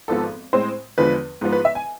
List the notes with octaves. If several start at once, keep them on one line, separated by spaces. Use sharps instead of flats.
G#1 G#2 F3 B3 A4
A2 G#3 C4 C5
E2 D3 F3 G#3 B4
G#2 F3 B3
B4
E5
G#5